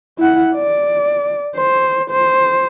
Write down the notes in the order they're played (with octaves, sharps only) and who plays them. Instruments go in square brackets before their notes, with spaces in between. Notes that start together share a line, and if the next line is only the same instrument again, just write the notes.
[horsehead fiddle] E4 F#5
D5
C5
C5